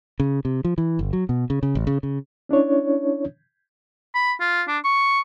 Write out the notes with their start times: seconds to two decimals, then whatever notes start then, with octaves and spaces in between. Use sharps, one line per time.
0.20 C#3
0.45 C3
0.65 F3
0.78 E3
0.99 G1
1.13 F#3
1.29 B2
1.50 C#3
1.63 C#3
1.75 A1
1.87 C#3
2.03 C#3
2.49 C#4 D4 E4 C#5
4.15 B5
4.40 F4
4.68 D4
4.85 C#6